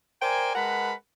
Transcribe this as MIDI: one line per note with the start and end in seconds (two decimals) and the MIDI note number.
0.22 0.54 70
0.22 0.54 72
0.22 0.54 74
0.22 0.54 79
0.22 0.54 80
0.55 0.92 56
0.55 0.92 70
0.55 0.92 71
0.55 0.92 78
0.55 0.92 81
0.55 0.92 83